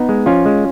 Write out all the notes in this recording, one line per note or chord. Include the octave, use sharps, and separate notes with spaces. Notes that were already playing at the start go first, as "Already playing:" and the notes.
Already playing: B3 D#4
G#3
F3 C#4 F4
G#3